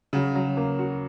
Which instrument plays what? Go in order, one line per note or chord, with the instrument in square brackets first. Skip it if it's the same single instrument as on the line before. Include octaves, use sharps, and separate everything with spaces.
[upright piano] C#3 [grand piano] F#3
[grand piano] F#3
A#3
F#4